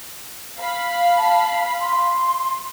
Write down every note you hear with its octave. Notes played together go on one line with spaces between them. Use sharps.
F5 B5
A5
C6